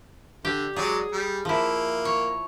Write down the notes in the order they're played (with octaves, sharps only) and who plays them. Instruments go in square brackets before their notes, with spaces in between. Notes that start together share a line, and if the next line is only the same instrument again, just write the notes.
[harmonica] D3 [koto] G4
[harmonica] F#3 G#3 D5 [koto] G#4
[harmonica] G3
[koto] F3 E4 [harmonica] A#3
[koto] C#5